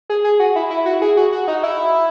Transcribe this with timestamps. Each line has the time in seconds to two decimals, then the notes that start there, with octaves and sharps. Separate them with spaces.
0.10 G#4
0.24 G#4
0.40 F#4
0.56 E4
0.70 E4
0.86 F#4
1.02 G#4
1.17 F#4
1.32 F#4
1.48 D#4
1.63 E4